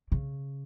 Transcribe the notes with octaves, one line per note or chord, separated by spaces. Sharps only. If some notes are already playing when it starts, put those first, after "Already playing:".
C#3